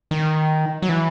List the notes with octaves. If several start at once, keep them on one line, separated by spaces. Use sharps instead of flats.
D#3
F#3
E3